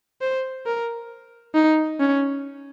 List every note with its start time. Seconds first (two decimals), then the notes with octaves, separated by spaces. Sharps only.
0.21 C5
0.66 A#4
1.54 D#4
1.99 C#4